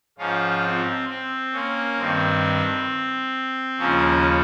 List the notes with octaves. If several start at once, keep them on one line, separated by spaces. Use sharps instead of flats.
G#2 F3 C#4 F4
C4
C4
A#3 C#4
G2 D#3 C4
D#2 C#3 F3 A#3 C#4